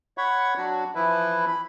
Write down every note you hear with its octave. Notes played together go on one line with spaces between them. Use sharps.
C#5 F#5 B5 C#6
F#3 D4 F#4
E3 F3 E4 B4
B5